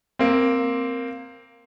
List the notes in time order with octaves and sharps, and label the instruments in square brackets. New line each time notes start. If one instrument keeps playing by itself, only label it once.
[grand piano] A#3 C4